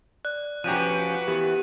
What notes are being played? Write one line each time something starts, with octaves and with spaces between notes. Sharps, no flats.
D5 F#6
F3 C#4 F#4 G4 B4 A#5 F#6 D#7
E3 B3 G4 A#4